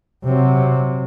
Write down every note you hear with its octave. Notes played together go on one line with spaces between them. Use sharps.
C3 F#3